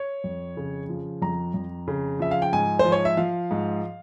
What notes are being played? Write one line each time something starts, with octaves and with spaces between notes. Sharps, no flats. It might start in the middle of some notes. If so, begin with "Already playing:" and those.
Already playing: C#5
F2
C#3
F3
F2 A#5
F2
C#3
F3 E5
F5
G5
G#2 G#5
C5
F3
C#5
E5
F3 F5
G#2